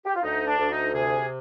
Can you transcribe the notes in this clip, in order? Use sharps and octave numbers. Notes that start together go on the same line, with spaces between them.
G4
F4
D2 D#4
D4
D2
D#4
C3 G#4